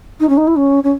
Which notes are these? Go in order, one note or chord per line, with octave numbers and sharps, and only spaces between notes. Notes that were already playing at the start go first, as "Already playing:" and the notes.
D#4
C#4
D#4
E4
C#4
C#4